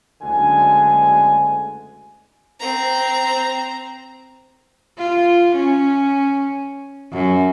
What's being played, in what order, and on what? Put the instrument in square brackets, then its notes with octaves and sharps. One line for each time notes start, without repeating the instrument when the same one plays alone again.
[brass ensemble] F#1 D2 D3 G#3 G#5
[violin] C4 A#5
[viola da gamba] F4
C#4
F#2